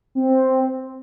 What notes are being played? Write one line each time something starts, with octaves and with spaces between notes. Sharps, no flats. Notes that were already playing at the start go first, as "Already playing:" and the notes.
C4